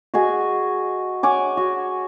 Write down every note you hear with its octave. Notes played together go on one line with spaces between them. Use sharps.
F#4 G#4 D#5 G#5
C#5 F#5 G#5 D6
F#4